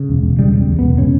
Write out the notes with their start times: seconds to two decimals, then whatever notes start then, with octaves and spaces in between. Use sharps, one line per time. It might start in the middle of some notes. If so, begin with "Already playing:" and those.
Already playing: C#3
0.09 E1
0.23 E1
0.39 C#3 G3
0.54 C#3
0.69 E2
0.79 E1 B3
0.98 C#3 C#4